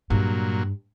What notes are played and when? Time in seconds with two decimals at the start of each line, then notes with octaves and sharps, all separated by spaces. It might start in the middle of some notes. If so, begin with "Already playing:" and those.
0.10 G2 A#2 F#3